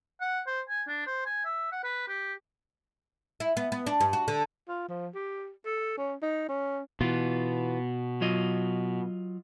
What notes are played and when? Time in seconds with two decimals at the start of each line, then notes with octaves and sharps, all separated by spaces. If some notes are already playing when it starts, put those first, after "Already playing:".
0.21 F#5
0.47 C5
0.69 G#5
0.87 D4
1.07 C5
1.26 G#5
1.45 E5
1.72 F#5
1.84 B4
2.08 G4
3.40 E4
3.57 B3
3.72 B3
3.87 D4
4.01 G2
4.13 F#4
4.28 D3
4.68 F4
4.89 F3
5.14 G4
5.66 A4
5.98 C#4
6.22 D#4
6.49 C#4
7.01 B2 E3 B3 F4
8.21 F#3 F4 D#5